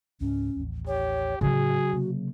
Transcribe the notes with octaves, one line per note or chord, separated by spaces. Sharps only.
C#2 G#2 G#3 C#4
A1 D#2
G4 C#5
A2 C#3 F#3 F#4 G#4
C3 A#3